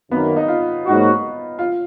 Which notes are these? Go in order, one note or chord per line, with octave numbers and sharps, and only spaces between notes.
F#2 D#3 A#3 B3
D#4
F4
G#2 F#3 A#3 D#4 F#4
F4